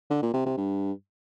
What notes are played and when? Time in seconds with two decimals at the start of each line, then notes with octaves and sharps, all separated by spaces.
0.10 D3
0.22 A#2
0.34 C3
0.46 C3
0.57 G2